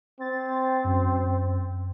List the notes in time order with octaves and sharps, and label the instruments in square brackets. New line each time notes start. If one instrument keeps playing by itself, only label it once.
[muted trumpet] C4 [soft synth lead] A6
[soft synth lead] F#2